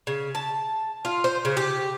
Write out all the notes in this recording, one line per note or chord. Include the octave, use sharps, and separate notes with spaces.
C#3
A5
F4
C5
C#3
G4